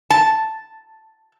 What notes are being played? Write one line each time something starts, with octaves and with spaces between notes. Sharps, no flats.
A5